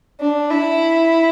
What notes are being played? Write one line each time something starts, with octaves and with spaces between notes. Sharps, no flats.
D4
E4